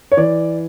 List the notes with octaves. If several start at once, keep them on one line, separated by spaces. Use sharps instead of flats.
C#5
E3 D5